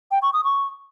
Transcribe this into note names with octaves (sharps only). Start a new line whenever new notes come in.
G5
C#6
D#6
C#6